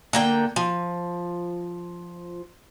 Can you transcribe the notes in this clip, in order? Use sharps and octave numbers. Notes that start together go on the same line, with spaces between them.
D3 A#3 G5
F3